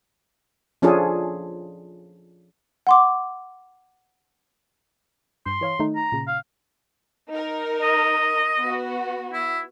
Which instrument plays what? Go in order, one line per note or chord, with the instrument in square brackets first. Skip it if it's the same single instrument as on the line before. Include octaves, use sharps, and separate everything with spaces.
[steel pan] F3 C#4 D4 F4 G#4 A4
[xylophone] F#5 C6 D6
[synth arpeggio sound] G2 [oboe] C6
[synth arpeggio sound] E3 C#5 F5
D#3 A3 D#4
[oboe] A#5
[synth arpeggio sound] A#2 C#3
[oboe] F5
[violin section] D#4 A#4
[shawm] D#5
[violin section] B3 F#4
[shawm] E4